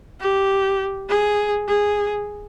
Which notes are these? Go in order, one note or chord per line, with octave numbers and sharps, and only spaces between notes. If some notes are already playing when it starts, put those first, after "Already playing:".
G4
G#4
G#4